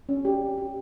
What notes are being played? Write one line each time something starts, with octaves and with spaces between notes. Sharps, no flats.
C#4
G4
C#4
G4